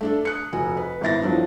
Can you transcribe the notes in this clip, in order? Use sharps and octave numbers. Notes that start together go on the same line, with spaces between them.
A3 D4 A4
D#6 F#6 C#7
F1 F#4 G#5
B4
G#1 B3 E4 A6 A#6
A2 F3 F#3 D4